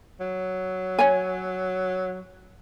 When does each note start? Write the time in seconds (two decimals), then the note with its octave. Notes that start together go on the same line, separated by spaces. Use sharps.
0.20 F#3
0.99 C#5 G#5